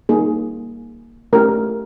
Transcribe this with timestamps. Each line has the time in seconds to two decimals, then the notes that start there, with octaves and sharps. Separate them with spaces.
0.09 G3 A#3 D#4 G#4
1.33 A3 C#4 E4 G4 A#4